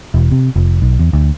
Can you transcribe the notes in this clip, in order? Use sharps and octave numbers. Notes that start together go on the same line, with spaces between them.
E1
C3
F1
B1
E2
D2